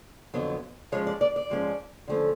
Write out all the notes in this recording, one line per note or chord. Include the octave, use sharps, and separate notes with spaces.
F2 D3 F#3 B3
G#2 F3 G#3 C#4 C#5
D5
D5
D5
G#2 F3 G#3 C#4
D3 F3 A3 C#4